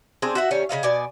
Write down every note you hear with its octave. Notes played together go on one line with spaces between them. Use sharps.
C4 D4 G#4
F#4 E5 F#5
D#3 G3 C#4
C#3 B3 D#5 F5
B2 D5 G#5